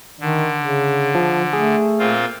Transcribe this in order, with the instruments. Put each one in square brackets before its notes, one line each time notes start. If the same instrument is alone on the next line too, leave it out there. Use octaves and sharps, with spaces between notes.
[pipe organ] D3 [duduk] D#3
[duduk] C#3
[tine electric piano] F3
[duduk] A3 [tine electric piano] G#4
[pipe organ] A#2 C4 F4